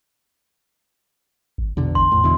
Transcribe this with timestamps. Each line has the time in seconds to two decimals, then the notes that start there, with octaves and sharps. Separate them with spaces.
1.58 G#1
1.77 E2 B2 D3
1.95 G#1 C6
2.12 E2 A2
2.24 B2 D3 E3